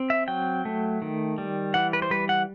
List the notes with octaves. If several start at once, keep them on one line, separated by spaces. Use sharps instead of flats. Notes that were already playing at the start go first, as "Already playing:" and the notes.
Already playing: C4
E5
F#3 G5
A3
D#3
G3
E3 F#5
B4
C5
G3 B4
F#5